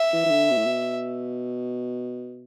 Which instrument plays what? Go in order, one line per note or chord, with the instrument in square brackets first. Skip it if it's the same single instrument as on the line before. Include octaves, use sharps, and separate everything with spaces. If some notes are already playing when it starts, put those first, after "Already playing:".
Already playing: [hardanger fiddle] E5
[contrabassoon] E3
E3
D3
B2
A2
B2